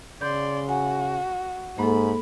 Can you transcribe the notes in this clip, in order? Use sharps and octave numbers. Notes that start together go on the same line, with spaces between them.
C#3 D5 C6 G6
F#4 G#5
G#2 A#3 A4 B5